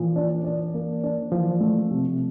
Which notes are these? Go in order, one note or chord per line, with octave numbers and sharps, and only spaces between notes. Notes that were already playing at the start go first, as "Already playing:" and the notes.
Already playing: A#2 E3 F3
D4
D4
A#3
D4
E3 F3
A3
C3